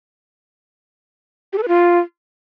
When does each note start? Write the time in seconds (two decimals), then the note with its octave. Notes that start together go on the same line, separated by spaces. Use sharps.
1.53 G4
1.58 A4
1.63 B4
1.68 F4